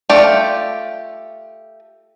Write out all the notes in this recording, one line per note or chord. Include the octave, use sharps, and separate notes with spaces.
A3 F4 G4 D5